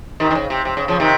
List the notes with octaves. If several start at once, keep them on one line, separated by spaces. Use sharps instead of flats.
C3 D#3
D#3
C#3
C3
C3
C#3
C#3 F3
C3 D#3